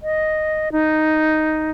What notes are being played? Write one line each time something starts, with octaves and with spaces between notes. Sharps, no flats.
D#5
D#4